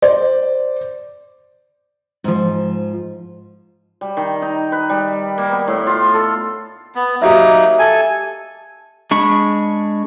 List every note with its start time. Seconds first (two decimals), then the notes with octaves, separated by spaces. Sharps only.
0.02 C5 D5
2.24 G#2 F3
4.01 G3
4.17 D#3
4.42 D#4
4.72 B4
4.89 G3
5.38 A#3
5.52 B3
5.68 A2
5.87 F4
6.14 A4
6.95 B3
7.22 F#3 A#3 D#4 G4 E5
7.79 A4 G#5
9.11 G#3 D4 B5 C#6